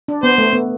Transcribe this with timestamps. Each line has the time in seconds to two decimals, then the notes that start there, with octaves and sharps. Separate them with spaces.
0.08 D4
0.23 B3 C5
0.38 A3
0.53 B3